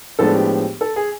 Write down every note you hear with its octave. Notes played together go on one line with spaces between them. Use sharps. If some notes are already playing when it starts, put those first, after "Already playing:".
A2 F3 G#3 B3 D4 A4
G4
A4
G#4